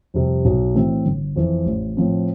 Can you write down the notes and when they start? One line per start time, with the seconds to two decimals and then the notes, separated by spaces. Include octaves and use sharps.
0.14 F2 C3 G3
0.45 B1
0.75 A2 E3 A3 C4
1.06 G1
1.36 F2 E3
1.66 A1
1.97 A2 F3 C4